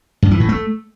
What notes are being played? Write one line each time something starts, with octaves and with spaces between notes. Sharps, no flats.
G2
E3
A2
A3